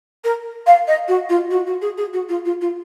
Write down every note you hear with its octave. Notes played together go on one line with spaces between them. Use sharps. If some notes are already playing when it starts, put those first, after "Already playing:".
A#4
F5
D#5
F#4
F4
F#4
F#4
G#4
G#4
F#4
F4
F4
F4